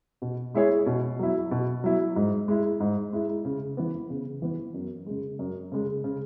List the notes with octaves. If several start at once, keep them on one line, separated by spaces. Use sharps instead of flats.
B2
G#3 E4 G#4 C#5
B2
F#3 E4
B2
F#3 E4
G#2
G#3 E4
G#2
G#3 E4
C#3
E3 B3
C#3
E3 B3
F#2
C#3 G#3
F#2
C#3 G#3
C#3